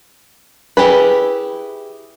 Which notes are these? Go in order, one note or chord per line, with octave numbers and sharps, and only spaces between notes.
E4 G4 G#4 B4